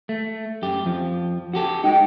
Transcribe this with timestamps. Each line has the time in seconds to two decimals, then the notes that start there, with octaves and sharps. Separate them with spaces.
0.09 A3
0.62 F#2 G4
0.84 F2 F3
1.54 F#4 G4 A4
1.84 G#3 D#4 G5